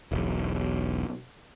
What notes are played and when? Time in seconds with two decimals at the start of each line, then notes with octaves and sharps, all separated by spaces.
0.12 E1 B1